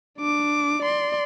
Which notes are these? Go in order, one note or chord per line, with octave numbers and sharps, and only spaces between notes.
D4 D6
D5 C6